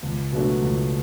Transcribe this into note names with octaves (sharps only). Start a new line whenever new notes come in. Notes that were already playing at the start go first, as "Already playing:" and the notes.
C#2
B2 F#3 A3 D4
C#2